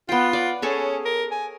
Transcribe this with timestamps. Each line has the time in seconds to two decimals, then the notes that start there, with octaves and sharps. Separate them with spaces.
0.09 B3 F4 G5
0.33 D5
0.62 C#4 G#4 A4 C#5
1.05 A#4
1.31 G#5